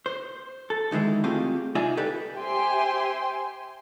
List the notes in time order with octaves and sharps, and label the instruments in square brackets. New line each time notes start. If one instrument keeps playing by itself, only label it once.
[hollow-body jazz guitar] C5
A4
D2 D#3 E3 G#3 E4
A3 C4 F4 G4 G#4 F5
C2 D#4 F4 D5 E5 G#5
G4 A4 B4 D5
[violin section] G4 C5 E5 G5 G#5 C6